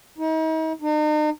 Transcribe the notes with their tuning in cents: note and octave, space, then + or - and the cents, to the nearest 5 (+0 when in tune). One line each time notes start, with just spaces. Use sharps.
D#4 +40
D#4 -40